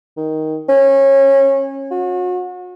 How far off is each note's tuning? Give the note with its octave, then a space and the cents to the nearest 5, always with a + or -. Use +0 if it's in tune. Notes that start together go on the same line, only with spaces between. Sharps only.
D#3 +10
C#4 -25
F#4 -35